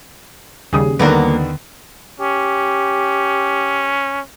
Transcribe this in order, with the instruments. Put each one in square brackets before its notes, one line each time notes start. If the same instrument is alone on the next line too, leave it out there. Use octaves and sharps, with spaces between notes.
[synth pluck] D#2 C#3 G3 [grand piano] G#4 D#6
[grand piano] D3 D#3 B3 [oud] F#3 A#3 A#4
[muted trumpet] C#4 [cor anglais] G4